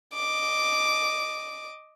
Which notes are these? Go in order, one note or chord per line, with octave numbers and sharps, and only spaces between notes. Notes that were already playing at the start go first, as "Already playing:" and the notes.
D#5 D6